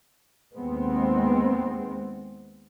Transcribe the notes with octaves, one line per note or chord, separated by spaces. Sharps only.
D#2 G#3 B3 C4